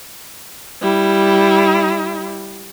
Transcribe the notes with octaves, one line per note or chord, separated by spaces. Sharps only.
G3 E4